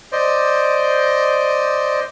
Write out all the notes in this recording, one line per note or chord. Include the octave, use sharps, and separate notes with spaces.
C5 D5 D#5